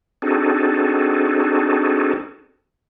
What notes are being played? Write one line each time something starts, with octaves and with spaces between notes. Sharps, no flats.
C4 D4 D#4 F#4 G#4 A4